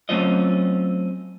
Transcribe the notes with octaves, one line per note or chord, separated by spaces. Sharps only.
F#3 A3 C4 C#4 F4 D#5